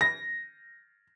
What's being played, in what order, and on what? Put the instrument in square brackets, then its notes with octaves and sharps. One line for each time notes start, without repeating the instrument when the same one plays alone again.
[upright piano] A#6